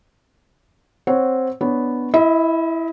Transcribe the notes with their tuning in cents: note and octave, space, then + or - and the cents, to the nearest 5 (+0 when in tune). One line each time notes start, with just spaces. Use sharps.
C4 +0 C#5 +0 F#5 +0
B3 +0 D4 +0 C#5 +0
E4 +0 D#5 +40